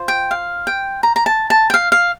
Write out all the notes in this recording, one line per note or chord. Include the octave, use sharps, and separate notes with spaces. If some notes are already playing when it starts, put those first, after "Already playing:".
Already playing: F4 C5
G5
F5
G5
A#5
A#5
A5
A5
G5
F5
F5